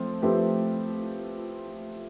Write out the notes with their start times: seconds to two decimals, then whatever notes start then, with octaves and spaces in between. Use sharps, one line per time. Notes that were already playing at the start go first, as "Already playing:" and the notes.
Already playing: F3 A3 C4
0.22 F3 A3 C4 G4 B4